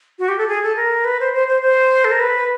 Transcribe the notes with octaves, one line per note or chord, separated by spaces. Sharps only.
F#4
G4
A4
G#4
A4
A#4
B4
C5
C5
C5
C5
A4
A#4
B4